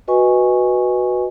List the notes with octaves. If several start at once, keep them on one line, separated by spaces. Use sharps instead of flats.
F#4 B4 D#5 G#5 C#6